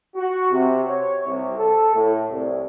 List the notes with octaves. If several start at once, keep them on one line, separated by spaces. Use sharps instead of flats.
F#4
C3
C#5
C2
A4
A2
C2